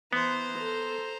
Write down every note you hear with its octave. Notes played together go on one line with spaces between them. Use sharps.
E3 B3 C5 A#5
A4